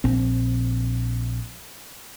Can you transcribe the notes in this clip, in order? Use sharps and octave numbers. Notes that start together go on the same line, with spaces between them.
A#1 C4